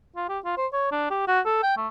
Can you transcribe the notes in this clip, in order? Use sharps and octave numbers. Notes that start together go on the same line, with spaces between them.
F4
G4
F4
C5
C#5
D4
G4
F#4
A4
G5
A3